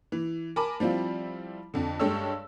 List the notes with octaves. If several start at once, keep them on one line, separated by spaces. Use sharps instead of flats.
E3
A#4 G#5 A5 B5 D6
F3 G3 C4 E4 F4
F2 D3
G2 G#3 G4 A4 C#5 E6